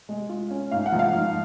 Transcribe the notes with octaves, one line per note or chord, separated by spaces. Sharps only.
G#3
F4
C#4
G#2 F5
F#5
F3
F5
G#2